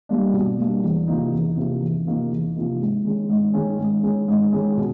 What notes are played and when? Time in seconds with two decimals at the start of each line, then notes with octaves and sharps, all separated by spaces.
0.09 G3 A#3 D4
0.34 B2
0.58 G3 A#3 D4
0.83 E2
1.08 C3 F3 A#3 D#4
1.32 E2
1.57 C3 F3 A#3 D#4
1.82 E2
2.06 C3 F3 A#3 D#4
2.31 E2
2.55 C3 F3 A#3 D#4
2.80 G#2
3.05 D#3 G#3 C#4
3.29 G#2
3.54 D#3 G#3 C#4
3.78 G#2
4.03 D#3 G#3 C#4
4.28 G#2
4.52 D#3 G#3 C#4
4.77 B2